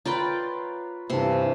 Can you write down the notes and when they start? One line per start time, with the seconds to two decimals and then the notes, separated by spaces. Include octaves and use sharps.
0.05 F4 B4 C#5 D5 G5 A#5
1.10 G2 C3 E3 E5 A5 C6